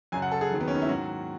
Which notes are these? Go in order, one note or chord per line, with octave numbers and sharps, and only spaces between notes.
F#2 C#3 F#3 G#5
F#5
A4
G#4
D#2 D#3 F#3
B3
C#4
D#4
E4
G#2 D#3 F#3 F#4